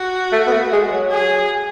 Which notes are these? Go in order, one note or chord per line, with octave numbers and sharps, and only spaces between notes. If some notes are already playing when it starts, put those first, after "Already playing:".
Already playing: F#4
A3
B3
A3
G#3
F#3
G#4